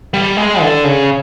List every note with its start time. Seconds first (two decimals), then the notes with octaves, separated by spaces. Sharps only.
0.14 G3
0.37 G#3
0.61 D3
0.84 C#3